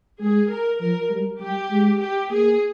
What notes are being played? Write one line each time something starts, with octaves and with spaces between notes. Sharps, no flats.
G#3 G#4
A#4
F3 A#4
G3
G3 G4
G#3
G4
A#3 G#4